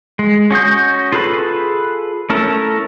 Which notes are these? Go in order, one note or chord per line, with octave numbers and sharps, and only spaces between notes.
G#3
C#4 F#4 D#5 G6
F4 G#4 A4 B4 B5
A3 C#4 E4 A4 A#4